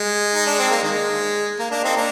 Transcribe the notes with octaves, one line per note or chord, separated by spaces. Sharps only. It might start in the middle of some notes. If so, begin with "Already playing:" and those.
Already playing: G#3
D#4
D4
C4
A#3
D#3 G#3
A#3
A#3 D4
C4 D#4
A#3 D4